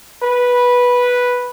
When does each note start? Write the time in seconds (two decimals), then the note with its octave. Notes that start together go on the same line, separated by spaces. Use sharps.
0.22 B4